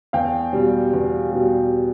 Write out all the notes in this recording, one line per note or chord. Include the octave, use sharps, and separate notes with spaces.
E2 F5 G5
B2 G3
E2
B2 G3